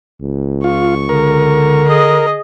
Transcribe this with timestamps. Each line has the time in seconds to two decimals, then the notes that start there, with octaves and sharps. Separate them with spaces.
0.22 C#2
0.64 F4 C#6
1.09 D3 A#4
1.87 G#4 D#5